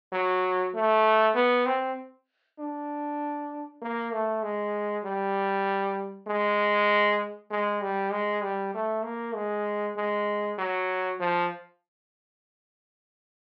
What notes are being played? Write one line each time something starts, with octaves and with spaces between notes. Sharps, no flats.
F#3
A3
B3
C4
D4
A#3
A3
G#3
G3
G#3
G#3
G3
G#3
G3
A3
A#3
G#3
G#3
F#3
F3